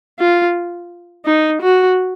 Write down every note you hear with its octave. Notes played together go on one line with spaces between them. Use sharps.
F4
D#4
F#4